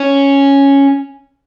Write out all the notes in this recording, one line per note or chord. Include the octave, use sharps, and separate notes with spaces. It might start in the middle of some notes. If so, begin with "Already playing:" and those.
Already playing: C#4